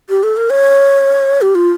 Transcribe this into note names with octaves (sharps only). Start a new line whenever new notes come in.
G4
A4
A#4
C#5
G4
F4